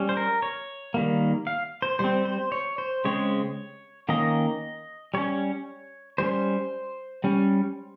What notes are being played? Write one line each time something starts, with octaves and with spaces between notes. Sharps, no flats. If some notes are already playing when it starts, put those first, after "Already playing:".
Already playing: G3 C#4
C5
A#4
C#5
D#3 G3 A#3
F5
C5
G3 C4 C5
C5
C#5
C5
C#3 G#3 C4 C#5
D#3 A#3 C#4 D#5
G3 C#4 C#5
G3 C#4 C5
G3 C#4